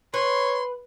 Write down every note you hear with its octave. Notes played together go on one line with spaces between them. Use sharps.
B4 C#5 C6